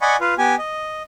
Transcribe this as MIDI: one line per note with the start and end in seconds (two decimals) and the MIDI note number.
0.02 0.16 74
0.02 0.16 75
0.02 0.16 78
0.02 0.16 80
0.02 0.16 83
0.02 0.16 85
0.20 0.34 65
0.20 0.34 71
0.38 0.55 59
0.38 0.55 67
0.38 0.55 80
0.58 1.03 75